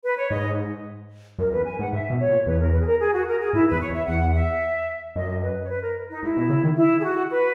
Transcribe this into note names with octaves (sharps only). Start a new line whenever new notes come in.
B4
C#5
G#2 D#5
F#2 A#4
E2 B4
G#5
G#2 F#5
G#2 E5
B2
C#5
A#2
E2 B4
A#4
B4
G#4
A#4
G#4
F#4
A#4
G#4
G#2 E4
E2 B4
C#5
E2
E5
E2 F#5
E5
F#2 D#5
B4
C#5
B4
A#4
D#4
G#2 E4
B2
C#3
D#3
E4
G#4
F#4
B4